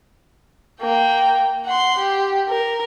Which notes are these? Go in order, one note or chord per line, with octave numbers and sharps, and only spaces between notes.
A#3 G5
F#5 C6
G4
A#4